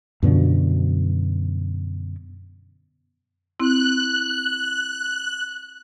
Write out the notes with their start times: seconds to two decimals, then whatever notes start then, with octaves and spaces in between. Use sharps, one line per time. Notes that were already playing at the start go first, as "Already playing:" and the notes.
0.23 F#2 B2 D3 F3
3.60 C4 E4 F#6